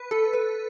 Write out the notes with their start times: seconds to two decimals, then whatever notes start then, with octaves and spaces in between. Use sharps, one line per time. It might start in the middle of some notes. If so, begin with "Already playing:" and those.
Already playing: B4
0.11 A4
0.33 B4